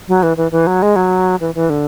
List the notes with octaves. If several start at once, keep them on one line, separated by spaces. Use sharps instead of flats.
F#3
E3
E3
E3
F#3
G#3
F#3
E3
E3
D3